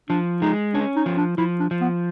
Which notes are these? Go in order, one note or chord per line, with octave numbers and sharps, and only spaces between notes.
F3 D4
G#3 D#4
C#4 D4
D#4
F3
D4
F3 E4
D4
F3
B3